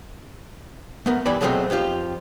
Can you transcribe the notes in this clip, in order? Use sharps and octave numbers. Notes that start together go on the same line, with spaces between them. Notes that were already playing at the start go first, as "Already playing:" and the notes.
A3 B3 A#4
G2 E3 D4 D5 B5
B2 F3 F#3 G#3 A3 C4
F2 F3 F4 G4